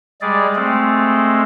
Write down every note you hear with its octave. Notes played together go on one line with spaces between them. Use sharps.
G3 G#3 G#4 D5
G#3 A3 C4